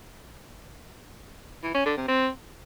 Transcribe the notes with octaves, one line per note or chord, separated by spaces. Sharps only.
E3
C#4
D3
C3
C4